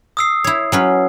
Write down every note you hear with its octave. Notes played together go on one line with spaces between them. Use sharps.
D#6 E6 C7
E4 C#5
F#3 C#4 B4